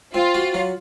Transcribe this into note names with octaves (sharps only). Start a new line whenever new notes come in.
C4 F4
F#4
F#3